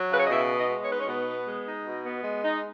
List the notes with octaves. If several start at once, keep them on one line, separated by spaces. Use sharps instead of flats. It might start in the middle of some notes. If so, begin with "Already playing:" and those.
Already playing: F#3
C#3 B4
C#5
D#5
B2 E4 E5
B3
D#4 D#5
G#3
C#5
D#4 B4
C#4 C#5
B2 B3 B4
B3
G#3
D#4
B2
B3
G#3
D#4